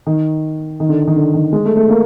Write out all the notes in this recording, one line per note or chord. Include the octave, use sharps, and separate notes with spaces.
D#3
D#3
D3
D#3
D3
D#3
G#3
A3
A3
A#3